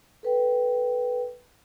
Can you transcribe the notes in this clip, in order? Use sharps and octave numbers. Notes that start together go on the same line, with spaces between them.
A4 B4 G5